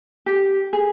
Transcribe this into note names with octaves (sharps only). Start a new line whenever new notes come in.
G4
G#4